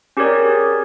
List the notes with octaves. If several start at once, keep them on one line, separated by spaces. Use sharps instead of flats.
C#4 G4 G#4 A#4 C#5 D5